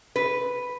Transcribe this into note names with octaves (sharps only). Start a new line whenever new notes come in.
B4